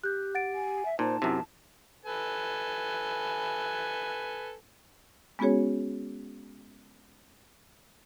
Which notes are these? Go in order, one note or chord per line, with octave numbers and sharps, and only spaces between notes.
G4 F#6 G6
F#5 A6 D7
G#5
E5
A#2 D#4 C5 A5
F#2 C3 E4
A4 B4 G#5
G#3 B3 C#4 F#4 G#4 C#5